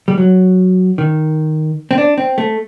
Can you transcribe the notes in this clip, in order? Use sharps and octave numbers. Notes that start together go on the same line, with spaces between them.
G3
F#3
D#3
C4
D4
C4
A3